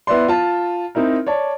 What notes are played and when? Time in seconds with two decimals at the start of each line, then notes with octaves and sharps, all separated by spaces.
0.07 B3 E4 B4 D5 C6
0.28 F4 A5
0.95 C4 D#4 E4 A#4
1.26 C#5 D5 A5